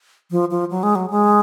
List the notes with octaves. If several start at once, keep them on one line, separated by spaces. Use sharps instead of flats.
F3
F3
F#3
G#3
F#3
G#3